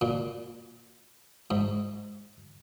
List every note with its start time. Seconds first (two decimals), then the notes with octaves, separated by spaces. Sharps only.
0.01 A#2
1.51 G#2